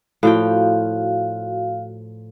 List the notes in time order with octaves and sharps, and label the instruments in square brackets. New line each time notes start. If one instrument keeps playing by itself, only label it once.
[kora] A2 F3 G5 [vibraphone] F#4 F5